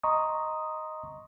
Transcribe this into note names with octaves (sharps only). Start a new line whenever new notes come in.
D#5 A#5 C6 C#6 D#6